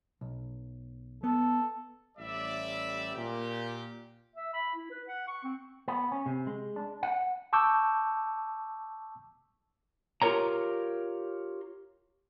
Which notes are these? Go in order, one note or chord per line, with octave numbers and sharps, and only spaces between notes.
B1
B3 A4
A1 G3 D5 E5
A#2 G4
E5
B5
E4
B4
F#5
C#6
C4
B3
C#4
C3
G#3
D4
F#5
A5 C#6 D6 E6 G6
F4 G4 G#4 A#4 C#5 A#5